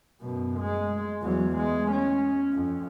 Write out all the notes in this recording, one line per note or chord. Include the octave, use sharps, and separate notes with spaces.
F#2 B2
G#3
E2 F#3
G#3
C#4
F2